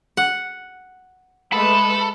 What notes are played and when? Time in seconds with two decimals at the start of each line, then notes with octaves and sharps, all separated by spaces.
0.17 F#5
1.53 G#3 A3 A4 B4 B5